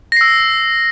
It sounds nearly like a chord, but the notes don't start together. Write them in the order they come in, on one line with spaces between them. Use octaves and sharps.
A#6 C7 E6